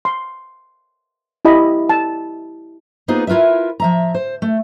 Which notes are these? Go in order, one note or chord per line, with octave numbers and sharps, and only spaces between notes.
C6
E4 G4 D#5 B5
A5
A#3 B3 D#4 F4 G#4 C5
E4 F4 A#4 B4 E5
F3 E5 A#5
C5
A3